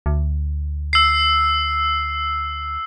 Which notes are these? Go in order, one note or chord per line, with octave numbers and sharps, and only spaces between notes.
D2
E6 C7